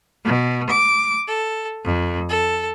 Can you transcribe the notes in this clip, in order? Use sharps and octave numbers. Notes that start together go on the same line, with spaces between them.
B2
D6
A4
F2
A4